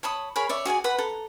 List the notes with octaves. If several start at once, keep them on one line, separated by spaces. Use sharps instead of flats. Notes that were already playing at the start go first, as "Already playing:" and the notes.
C#5 A5 B5 D#6
G#4 A#4 C#5 B5
C#5 D5 E5
F#4 G#4 D5 G#5
B4 F#5 B5
A4 A#5